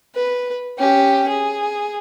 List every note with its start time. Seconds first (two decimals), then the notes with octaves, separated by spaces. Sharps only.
0.15 B4
0.78 C#4 G4
1.29 G#4